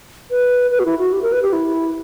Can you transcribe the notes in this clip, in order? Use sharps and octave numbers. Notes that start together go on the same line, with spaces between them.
B4
B4
F#4
E4
F#4
G4
A#4
B4
G4
E4